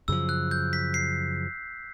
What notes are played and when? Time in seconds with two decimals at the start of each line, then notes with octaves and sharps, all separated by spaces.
0.08 F#2 C#3 F3 E6
0.29 F#6
0.51 G6
0.73 B6
0.94 C7